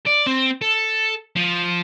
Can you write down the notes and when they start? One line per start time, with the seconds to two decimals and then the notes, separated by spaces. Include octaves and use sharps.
0.06 D5
0.26 C4
0.61 A4
1.36 F3